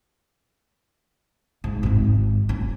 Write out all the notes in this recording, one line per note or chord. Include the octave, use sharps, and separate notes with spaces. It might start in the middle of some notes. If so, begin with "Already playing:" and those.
G#2
G#1 G#2
C#4